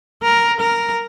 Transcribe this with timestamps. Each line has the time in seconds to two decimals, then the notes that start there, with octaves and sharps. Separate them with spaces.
0.22 A#4
0.59 A#4